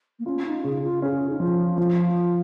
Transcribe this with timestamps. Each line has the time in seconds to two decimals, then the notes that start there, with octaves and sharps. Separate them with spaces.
0.19 A#3
0.26 C#4 F4
0.46 D#4
0.64 C#3 G#4
0.83 F4
1.02 C#4 G#4
1.29 D#4
1.40 F3 F4
1.78 F3